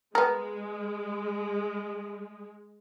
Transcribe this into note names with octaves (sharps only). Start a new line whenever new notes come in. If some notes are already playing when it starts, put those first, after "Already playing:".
G#3 B3 A#4